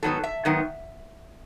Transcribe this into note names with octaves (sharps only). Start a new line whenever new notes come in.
G#2 D#3 F#3 B3 A4
E5
G#2 D#3 F#3 B3